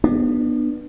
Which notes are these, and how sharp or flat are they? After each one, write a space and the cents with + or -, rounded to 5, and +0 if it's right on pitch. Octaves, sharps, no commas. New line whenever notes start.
B3 -15 D4 +35